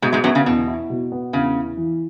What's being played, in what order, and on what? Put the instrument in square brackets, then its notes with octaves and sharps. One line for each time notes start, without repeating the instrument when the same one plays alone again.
[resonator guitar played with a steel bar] G#2 G#3 [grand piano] B2
[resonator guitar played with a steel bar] G#2 G#3
[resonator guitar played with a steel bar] F#2 F#3 [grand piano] B3
[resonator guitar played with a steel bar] C#3
[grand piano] E2 [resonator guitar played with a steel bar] B2
[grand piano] E4
B2
B3
[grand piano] E2 [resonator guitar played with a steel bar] C#3
[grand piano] E4
E3